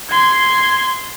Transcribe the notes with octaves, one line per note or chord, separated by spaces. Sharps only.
C6 G#6